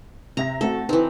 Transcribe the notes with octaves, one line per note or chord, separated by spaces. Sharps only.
C3 E5 A#5 A#6
A3 C4 F#4 A4
E3 C4 D#4